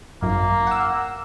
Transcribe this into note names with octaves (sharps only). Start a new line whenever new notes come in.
G#1 F#2 A#3
F#5 E6